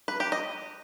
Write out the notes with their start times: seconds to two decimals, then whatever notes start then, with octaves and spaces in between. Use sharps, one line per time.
0.08 B4
0.20 G4
0.32 D#5